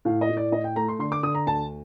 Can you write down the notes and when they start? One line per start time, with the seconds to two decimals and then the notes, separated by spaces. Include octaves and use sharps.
0.05 A2 F5
0.21 D#5
0.29 A2
0.37 D5
0.52 A2 D#5
0.64 G5
0.76 A3 A#5
0.88 C6
0.99 D3 C6
1.12 D6
1.23 D3 D#6
1.35 A#5
1.47 D2 A5